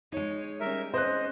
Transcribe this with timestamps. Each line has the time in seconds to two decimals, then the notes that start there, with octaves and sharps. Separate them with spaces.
0.12 G#3 D#4 C#5
0.60 G3 C#4 A#4 E5
0.94 C4 C#4 C5 D#5 F#6